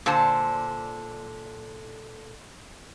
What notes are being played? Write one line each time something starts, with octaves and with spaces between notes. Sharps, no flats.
A#2 D3 C5 A5